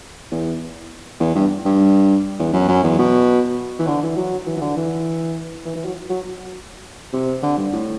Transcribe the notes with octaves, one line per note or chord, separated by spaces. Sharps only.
E2
E2
G2
G2
E2
F#2
F#2
E2
B2
E3
D3
E3
F#3
E3
E3
D3
E3
E3
E3
F#3
F#3
C3
D3
G2
A2